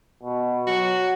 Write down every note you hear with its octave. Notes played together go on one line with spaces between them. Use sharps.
B2
F#3 F#4